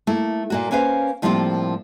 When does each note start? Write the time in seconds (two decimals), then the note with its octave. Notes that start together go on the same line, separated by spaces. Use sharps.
0.07 A3 A#3 E4
0.50 A#2 A#3 F#4
0.71 A#3 C#4 B4 C5 F5
1.22 A2 F3 G3 A#3 C4 F4